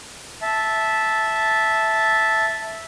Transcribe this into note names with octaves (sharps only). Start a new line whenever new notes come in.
E5 A5